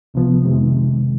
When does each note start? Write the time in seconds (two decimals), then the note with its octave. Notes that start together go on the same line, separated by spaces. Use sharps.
0.14 C2 C3 F3 B3
0.45 F2 C3 D#3 G#3